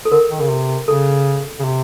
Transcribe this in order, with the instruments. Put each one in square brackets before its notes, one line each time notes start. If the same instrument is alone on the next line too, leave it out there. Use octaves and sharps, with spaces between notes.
[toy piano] A4
[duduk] D3 [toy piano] A#4
[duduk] D#3
C#3
C3
[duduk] C#3 [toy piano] A4
[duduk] C#3
C3